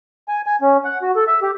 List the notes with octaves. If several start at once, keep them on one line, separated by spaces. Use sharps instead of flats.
G#5
G#5
C#4
F#5
F#4
A4
E5
G4